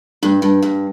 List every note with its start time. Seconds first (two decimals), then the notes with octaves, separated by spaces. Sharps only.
0.23 G2
0.42 G2
0.62 G2